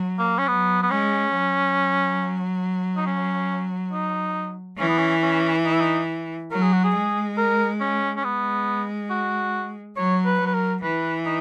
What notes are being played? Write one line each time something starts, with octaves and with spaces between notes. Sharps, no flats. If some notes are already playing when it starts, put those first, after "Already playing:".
Already playing: F#3
A#3
C#4
F#3 B3
B3
G#3 C#4
F#3
D#4
C#4
D#4
E3 C#4
B3
C#4
C#4
D#4
E4
D#4
F#3 A#4
G#4
F#4
G#4
G#3
A#4
C#4
C#4
G#3 B3
F#4
F#3 C#5
B4
F#3
B4
A#4
E3 B4
D#4